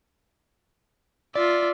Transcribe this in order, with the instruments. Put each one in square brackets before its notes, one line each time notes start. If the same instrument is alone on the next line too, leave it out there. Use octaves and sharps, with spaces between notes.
[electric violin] F4 E5 [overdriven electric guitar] D5